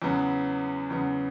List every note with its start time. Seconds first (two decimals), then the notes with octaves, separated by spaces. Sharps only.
0.02 E2 C#3 F#3 B3
0.90 E2 C#3 F#3 B3